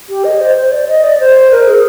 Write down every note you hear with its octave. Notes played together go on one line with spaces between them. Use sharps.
G4
D#5
C5
C5
D5
D#5
D5
C5
A#4
G#4